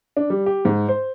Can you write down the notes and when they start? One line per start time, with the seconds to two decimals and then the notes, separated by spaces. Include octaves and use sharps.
0.17 D4
0.30 G3
0.46 G4
0.65 G#2
0.89 C5